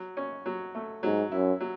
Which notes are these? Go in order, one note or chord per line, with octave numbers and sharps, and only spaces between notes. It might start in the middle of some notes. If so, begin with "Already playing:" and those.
Already playing: F#3
C#4
F#3
A3
G#2 F#3
F#2 E4
F#3